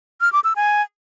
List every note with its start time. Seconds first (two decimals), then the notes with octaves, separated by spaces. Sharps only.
0.21 F6
0.33 D6
0.44 E6
0.56 G#5